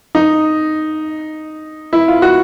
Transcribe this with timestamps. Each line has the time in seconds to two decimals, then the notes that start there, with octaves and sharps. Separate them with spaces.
0.15 D#4
1.93 E4
2.08 F4
2.22 F#4